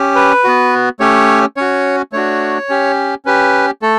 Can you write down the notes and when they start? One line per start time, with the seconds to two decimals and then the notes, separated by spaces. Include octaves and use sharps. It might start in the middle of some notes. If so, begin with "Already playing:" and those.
Already playing: C#4 G4
0.15 B4
0.44 B3 F#4
1.00 A3 C#4 G4 C#5
1.57 C#4 F#4 C#5
2.12 A3 D4 F#4 C#5
2.70 C#4 G4
3.25 C#4 G4 B4
3.82 A3 A4